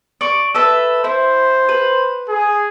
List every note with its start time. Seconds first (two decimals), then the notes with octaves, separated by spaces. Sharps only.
0.21 D5 C#6
0.55 A4 B4 E5
1.04 E4 C5
1.69 B4
2.28 G#4